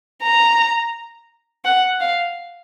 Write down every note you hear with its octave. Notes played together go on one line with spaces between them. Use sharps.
A#5
F#5
F5